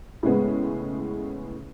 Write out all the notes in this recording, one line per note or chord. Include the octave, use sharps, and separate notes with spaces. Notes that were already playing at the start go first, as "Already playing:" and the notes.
A2 C#3 G#3 B3